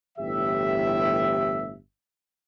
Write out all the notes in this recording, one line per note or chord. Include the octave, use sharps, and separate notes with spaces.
G1 A2 E3 G4 E5